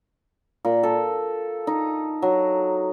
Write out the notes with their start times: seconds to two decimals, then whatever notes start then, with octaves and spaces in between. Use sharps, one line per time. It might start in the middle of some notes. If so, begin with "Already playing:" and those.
0.65 A#2
0.83 A4
1.67 D#4
2.22 F#3